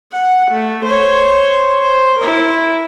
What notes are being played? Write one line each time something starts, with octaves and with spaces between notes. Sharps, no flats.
F#5
A3
C5 C#5
C5
E4 A#4